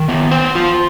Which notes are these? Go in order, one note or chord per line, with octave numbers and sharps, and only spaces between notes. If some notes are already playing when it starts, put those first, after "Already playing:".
Already playing: D#3
B3
C5
F4